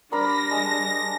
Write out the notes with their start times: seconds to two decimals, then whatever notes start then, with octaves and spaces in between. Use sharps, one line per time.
0.12 G3 D4 A#4 C5 D5 B5 A#6
0.51 G#3 A5